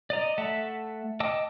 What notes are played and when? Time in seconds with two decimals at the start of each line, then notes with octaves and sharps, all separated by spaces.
0.10 D5 D#5 A#5
0.38 A3 E5 F#5 A5
1.20 D#5 G5 A5 D6 E6